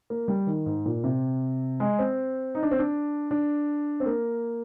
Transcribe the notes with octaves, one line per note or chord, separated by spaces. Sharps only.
A#3
G3
D#3
G#2
A#2
C3
G#3
C4
D#4
D4
C4
D4
D4
C4
A#3